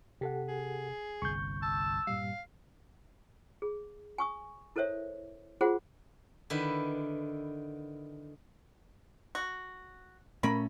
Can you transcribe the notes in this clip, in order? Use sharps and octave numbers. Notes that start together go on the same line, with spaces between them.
C3 G4 A4 F#5
G#4
G1 C2 C#6 G6
A5 E6
G2 A#2 G3 F5
G#4
G#5 C#6 D#6
E4 A4 A#4 C5 C#5 E5
F4 F#4 G#4 C5 F#5
D3 D#3 E4 B4
F#4
A#2 A3 C#4 A#4 B5